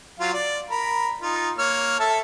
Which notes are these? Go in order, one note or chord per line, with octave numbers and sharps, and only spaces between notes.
F#3 F4 F5
D5
A#4 B5
D#4 F4
A#3 C#5 F6
A4 E5 A5